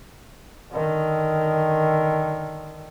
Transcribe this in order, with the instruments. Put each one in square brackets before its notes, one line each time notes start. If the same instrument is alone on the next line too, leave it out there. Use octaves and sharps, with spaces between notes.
[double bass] D3 D#3